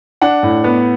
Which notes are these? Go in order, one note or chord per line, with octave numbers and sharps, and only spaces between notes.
D4 F#5
A2
B3